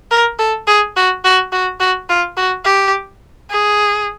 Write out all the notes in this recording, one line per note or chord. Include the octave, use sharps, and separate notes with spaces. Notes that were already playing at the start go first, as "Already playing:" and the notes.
A#4
A4
G#4
F#4
F#4
F#4
F#4
F4
F#4
G4
G#4